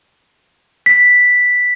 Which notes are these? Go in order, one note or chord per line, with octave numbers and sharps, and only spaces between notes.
B6